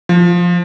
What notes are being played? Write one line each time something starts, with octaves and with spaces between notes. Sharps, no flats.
F3